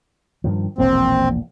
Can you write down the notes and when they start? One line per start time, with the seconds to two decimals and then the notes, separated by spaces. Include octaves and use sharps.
0.44 G2 D#3 F3
0.78 E1 A#1 A#3 C4